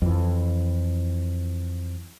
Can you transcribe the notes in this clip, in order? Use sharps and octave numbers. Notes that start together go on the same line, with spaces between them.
F2 E3